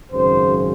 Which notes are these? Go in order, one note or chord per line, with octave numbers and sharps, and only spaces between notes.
G#1 F#2 C#3 C5